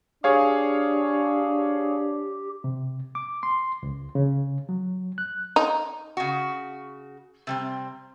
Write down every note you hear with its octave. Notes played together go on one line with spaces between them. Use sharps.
D4 G4 G#4 C#5 F5
C3
D6
C6
C#2
C#3
F#3
F#6
D#4
C#3 F#4
C3 G3 C4